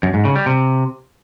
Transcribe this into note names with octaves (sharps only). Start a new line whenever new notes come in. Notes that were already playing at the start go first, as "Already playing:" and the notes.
F#2
G#2
C#3
G3
C3